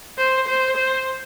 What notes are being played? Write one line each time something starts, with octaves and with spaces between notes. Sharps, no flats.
C5
C5
C5